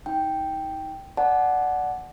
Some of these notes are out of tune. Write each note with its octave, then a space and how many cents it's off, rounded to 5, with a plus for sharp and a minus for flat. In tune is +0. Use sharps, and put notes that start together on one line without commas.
D#4 +25 G5 +0
D5 +0 F#5 +0 A5 -35